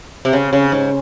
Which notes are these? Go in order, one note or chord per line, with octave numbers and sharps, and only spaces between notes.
C3
C#3 C4
C#3
G#2 C#3 C#4